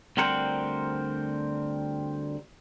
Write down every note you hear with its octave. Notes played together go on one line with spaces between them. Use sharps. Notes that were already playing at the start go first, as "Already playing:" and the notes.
D2 G3 C4 A#4 C5 F#5